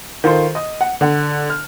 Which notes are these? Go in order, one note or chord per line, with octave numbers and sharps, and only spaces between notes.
D#3 F4 A4 C5
D#5 D#6
F#5
D3 F#5
F6